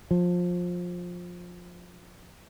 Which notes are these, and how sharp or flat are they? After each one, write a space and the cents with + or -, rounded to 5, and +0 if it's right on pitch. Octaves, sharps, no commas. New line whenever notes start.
F3 +20